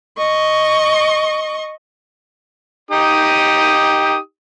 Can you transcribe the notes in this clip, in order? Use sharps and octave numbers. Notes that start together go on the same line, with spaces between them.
D#5 C#6
D#4 G4 D#6